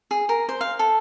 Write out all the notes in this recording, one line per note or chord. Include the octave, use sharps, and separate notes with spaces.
G#4
A#4
C5
F5
A4